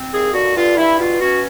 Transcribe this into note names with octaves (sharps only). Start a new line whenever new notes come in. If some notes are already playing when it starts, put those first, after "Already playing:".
Already playing: C4
D#2 G#4
D3 F#4
G2 F4
G2 E4
B2 F4
C#4 F#4